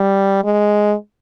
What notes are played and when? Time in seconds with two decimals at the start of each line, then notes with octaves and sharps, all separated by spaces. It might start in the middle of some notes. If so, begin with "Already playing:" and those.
Already playing: G3
0.44 G#3